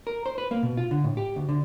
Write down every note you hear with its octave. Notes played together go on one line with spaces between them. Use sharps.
A#4
C5
B4
A#3
B2
F4
D3
A2
G4
D2
D3